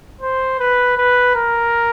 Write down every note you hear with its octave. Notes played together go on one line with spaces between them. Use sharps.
C5
B4
B4
A#4